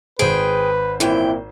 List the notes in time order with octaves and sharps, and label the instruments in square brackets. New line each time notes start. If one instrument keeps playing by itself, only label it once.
[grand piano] G#1 C5 [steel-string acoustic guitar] G#4 G5 [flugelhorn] B4
[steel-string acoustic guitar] F#2 E3 G5 [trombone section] A#2 C4 E4